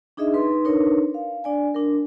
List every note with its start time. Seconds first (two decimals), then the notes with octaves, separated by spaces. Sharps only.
0.17 D4 D#4 G#4 D#5 E5
0.34 D#4 B4 C6
0.65 D4 D#4 A#4 B4 C#5
1.14 F5
1.44 D4 D5 G#5
1.74 D4 A#4